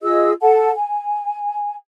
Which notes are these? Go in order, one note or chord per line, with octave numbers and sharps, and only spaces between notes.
F4 G#4 D#5 E6
A4 F#5 A5
G#5